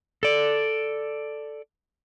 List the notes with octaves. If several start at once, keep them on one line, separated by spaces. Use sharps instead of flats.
A4 D5